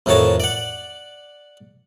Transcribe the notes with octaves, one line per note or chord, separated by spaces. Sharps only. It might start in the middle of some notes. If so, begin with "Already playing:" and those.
F2 A2 D#3 F#4 C#5 A5
D5 F#5